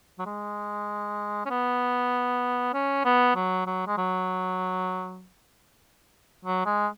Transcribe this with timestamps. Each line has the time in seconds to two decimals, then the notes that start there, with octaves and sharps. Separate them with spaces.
0.19 F#3
0.26 G#3
1.46 C#4
1.50 B3
2.73 C#4
3.05 B3
3.36 F#3
3.66 F#3
3.87 G#3
3.97 F#3
6.45 F#3
6.66 G#3